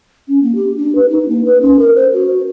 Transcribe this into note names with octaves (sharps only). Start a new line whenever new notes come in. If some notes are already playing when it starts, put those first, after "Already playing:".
C#4
A#3
G4
D4
B4
D#4
A#3
B4
C#4
A#4
C5
F#4